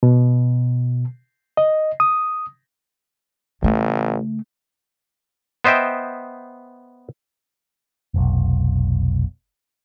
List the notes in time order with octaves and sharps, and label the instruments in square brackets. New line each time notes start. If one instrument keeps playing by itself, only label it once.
[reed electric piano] B2
D#5
D#6
[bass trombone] A1 [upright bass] C#3 A3
[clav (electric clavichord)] B3 C5 D#5 E5 G5
[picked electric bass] F1 B1